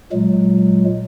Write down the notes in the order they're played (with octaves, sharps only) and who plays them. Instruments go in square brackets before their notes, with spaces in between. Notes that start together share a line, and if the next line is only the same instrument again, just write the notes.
[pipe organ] A#2 F#3 G#3